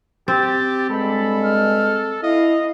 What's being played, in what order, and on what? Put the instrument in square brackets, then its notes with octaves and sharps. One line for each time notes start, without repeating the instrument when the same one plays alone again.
[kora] C4 [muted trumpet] G4 [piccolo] A6
[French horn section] G2 G#3 [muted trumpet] A4 [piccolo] B5
[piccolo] F6
[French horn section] E4 [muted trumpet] D#5 [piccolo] F5